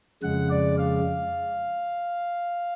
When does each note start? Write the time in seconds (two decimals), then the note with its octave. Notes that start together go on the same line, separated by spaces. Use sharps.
0.22 F2 C#3 G#3 F#5
0.50 D5
0.78 F5